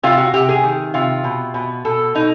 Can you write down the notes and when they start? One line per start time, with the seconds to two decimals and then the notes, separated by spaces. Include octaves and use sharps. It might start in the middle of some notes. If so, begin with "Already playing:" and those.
0.03 C3 F4
0.18 F#4
0.33 C3 G4
0.49 G#4
0.64 D#3
0.94 C3 F4
1.24 B2
1.54 B2
1.85 B2 A4
2.15 B2 D#4